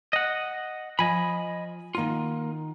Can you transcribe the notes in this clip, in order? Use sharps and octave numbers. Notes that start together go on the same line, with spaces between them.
D#5 F#5
F3 D#5 G#5 B5
D#3 A#3 D#4 F4 F#5